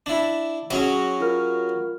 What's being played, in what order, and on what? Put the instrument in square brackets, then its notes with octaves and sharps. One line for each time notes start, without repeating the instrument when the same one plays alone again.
[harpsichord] D4 E4
[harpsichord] F#3 C#4 G#4 [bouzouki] F#4
[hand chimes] F4 A#4 F6